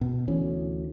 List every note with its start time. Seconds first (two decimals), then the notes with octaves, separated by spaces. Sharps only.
0.01 B2
0.28 D2 E3 C#4